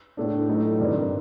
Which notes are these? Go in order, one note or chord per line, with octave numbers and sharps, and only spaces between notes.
A2 A3 D4
A2 F#3 A3 D#4
G2 D#3 G3 C4 D#4